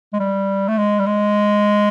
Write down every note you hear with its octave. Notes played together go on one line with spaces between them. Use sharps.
G#3
G3
A3
G#3
G3
G#3